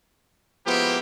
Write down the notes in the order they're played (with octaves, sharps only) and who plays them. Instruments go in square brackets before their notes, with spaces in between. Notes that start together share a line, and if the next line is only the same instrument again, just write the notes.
[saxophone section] F3 G#3 B3 [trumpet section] A#3 E4 G4